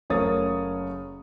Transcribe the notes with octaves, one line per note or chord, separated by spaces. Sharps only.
F#1 A3 A#4 C#5 D#6 A6